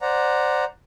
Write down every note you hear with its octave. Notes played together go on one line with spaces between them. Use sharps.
C5 D5 F#5 A#5